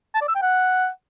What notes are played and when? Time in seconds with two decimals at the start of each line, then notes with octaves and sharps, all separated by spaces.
0.15 A5
0.21 D5
0.28 E6
0.35 G5
0.42 F#5